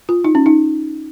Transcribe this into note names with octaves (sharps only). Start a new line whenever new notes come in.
F4
D#4
C#4
D#4